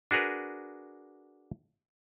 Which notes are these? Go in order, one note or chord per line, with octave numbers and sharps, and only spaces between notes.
D4 F#4 G#4 A#4 B4